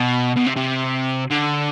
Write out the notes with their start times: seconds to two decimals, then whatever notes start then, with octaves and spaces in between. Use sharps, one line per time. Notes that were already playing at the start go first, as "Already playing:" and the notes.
Already playing: B2
0.36 B2
0.46 C3
0.57 C3
1.30 D3